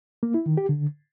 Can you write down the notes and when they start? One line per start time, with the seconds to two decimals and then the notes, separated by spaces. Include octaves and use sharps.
0.23 A#3
0.34 E4
0.46 D#3
0.57 G4
0.69 D3